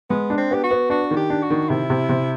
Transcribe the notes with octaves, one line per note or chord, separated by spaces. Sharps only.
G#3 B3
D4
C4
B3 G4
F#4
B3
D4 F#4
D#3
G4
D4
F#4
D#3
C3 E4
C3
C3